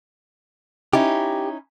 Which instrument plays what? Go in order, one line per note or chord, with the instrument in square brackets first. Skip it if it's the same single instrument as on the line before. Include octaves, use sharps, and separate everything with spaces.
[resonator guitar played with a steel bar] C#4 D#4 E4 [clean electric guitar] G4